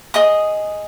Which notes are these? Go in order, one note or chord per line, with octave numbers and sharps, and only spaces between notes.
G#4 D#5 D#6